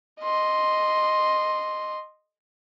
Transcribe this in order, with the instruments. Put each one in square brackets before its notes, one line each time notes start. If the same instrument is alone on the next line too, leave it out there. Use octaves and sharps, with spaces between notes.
[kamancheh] D#5 C6